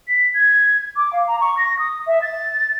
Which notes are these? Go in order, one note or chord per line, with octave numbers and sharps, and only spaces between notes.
B6
G#6
D6
F5
A#5
C#6
A#6
D#6
E5
A6